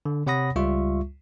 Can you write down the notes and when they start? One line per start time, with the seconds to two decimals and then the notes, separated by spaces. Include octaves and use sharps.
0.06 D3
0.27 C3 C#5 F#5 B5 D#6 A#6
0.56 C#2 G3 F4 E5 C#6